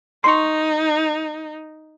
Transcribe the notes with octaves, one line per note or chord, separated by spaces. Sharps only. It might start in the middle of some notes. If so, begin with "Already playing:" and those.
D#4 C6 C#6